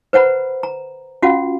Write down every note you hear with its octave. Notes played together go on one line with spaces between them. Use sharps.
B4 C5 F#5 A#5 B5
A#5
C#4 F4 F#4 F5 F#5